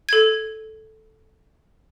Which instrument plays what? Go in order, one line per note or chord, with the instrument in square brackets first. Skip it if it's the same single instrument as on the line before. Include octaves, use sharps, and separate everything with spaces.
[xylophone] A4 G#6